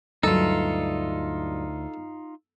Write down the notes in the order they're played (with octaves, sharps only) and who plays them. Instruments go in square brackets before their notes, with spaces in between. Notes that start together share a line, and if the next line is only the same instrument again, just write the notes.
[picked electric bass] D2 [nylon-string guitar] G2 F#3 [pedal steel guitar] D#4 F4 [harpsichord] A4